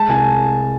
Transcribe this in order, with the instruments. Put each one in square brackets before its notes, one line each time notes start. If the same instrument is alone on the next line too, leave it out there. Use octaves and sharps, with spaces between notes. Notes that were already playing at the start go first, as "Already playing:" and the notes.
Already playing: [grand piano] G#3 A5
C2 G#5